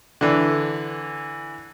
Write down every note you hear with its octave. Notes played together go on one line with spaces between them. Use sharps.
D3 E3